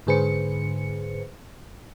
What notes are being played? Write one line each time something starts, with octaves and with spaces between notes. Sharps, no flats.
G#2 D3 G#4 B4 C5 C#7